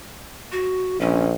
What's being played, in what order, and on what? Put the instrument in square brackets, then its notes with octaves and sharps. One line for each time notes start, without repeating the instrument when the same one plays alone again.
[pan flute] F#4
[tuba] A#1 [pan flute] C#4